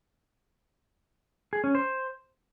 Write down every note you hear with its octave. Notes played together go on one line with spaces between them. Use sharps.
G#4
C#4
C5